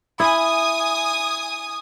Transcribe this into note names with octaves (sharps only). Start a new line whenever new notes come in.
E4 G#5 D#6